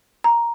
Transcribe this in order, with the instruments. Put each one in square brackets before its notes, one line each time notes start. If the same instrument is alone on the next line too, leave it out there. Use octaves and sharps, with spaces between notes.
[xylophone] A#5